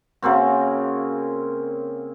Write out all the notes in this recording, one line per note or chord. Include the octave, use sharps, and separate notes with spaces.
C#3 A#3 C4 F#4